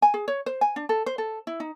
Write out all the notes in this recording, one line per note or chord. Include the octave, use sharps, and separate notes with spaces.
G#5
G#4
C#5
C5
G#5
D4
A4
C5
A4
E4
D#4